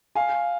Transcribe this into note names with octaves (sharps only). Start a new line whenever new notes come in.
F5 G#5